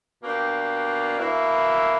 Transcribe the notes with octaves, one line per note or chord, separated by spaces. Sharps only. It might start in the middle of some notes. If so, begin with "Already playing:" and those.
B2 A#3 D4 G4
B2 A#3 E4